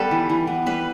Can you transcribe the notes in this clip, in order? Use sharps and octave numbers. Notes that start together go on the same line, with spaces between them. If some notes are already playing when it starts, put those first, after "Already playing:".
Already playing: G3 B3 A4 B4
E3
E3
B3
G3 B4